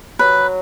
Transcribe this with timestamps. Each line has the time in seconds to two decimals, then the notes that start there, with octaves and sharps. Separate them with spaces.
0.19 F#3 B4